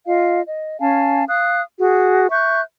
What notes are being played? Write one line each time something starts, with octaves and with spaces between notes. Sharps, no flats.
F4 D#5 F5
D#5
C#4 F5 G#5 A5
F5 D#6 F#6
F#4 G#4
E5 C#6 F#6 G6